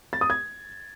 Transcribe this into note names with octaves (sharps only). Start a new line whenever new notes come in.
A6
D#6
G#6